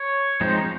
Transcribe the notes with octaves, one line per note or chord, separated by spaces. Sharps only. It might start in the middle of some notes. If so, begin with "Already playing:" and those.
Already playing: C#5
F3 G#3 C4 D#4